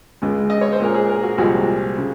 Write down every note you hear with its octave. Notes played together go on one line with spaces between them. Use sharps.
C#2 C#3 G#3
D#5
C#5
C5
A#2 G#3 A#4
G#4
A#4
F#4
C2 A#2 F3 G#3 F#4
C#3